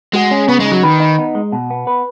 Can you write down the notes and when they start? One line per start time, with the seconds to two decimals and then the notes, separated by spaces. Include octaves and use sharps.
0.14 G#3 F#4
0.31 C#4
0.48 C#3 B3
0.60 G#3
0.65 D#4
0.72 F#3
0.83 D#3 B4
1.00 D#4
1.18 B3
1.35 G#3
1.52 B2
1.70 B3
1.87 B4